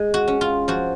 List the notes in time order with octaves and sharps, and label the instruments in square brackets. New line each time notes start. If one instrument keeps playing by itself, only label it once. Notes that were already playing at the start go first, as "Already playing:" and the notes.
Already playing: [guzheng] G#3
F#4
C#4
F4
F3 F#4